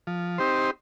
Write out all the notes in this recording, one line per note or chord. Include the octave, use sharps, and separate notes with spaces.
F3
C4 D#4 G4 C5